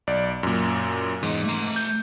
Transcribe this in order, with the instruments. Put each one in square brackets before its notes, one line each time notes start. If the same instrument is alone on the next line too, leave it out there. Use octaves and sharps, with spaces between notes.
[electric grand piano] B1 D5
F#2 A#2
[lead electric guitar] E2 D#5 [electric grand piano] G#2
[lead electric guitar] A3 A#5
[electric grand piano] G6